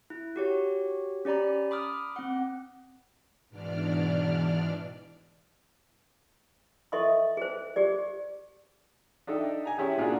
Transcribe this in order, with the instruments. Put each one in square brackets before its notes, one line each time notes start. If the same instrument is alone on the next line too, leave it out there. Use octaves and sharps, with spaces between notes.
[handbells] E4
F#4 G4 C#5
C#4 G4 D5 A#5 B5
B5 D6 D#6 F6
C4 F#5
[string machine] G#2 B2 E3 D4 D5 F6
[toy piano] A4 D#5 E5 C6 C#6
G#4 C5
G4 G#4 D5
[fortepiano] D4 D#4 A4 E5 G5
G#5 A#5
C#4 E4 G4 G#4
A#2 D4 F4 F#4 G#4